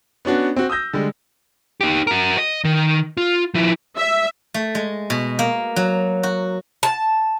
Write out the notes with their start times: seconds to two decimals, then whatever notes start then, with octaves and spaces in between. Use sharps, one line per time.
0.25 B3 C#4 D4 F#4
0.56 C4 F#4
0.70 D#6 E6 G6 A#6
0.93 D3 G3 G#3
1.81 D#4 G4
2.07 F#4 A#4
2.38 D#5
2.65 D#3
3.17 F4
3.55 F3 E4
3.96 E5
4.54 A3
4.75 G#3
5.10 B2
5.39 A#3
5.76 F#3
6.23 F#4
6.83 A5